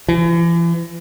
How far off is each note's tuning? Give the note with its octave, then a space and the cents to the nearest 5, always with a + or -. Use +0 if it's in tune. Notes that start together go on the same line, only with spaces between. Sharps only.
E3 +40